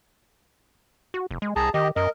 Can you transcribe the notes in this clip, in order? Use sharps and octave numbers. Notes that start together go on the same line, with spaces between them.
F#4
F1
G#3
C2 G#4 A5 A#5
D#3 G4 D#5
F#2 A#4 D#5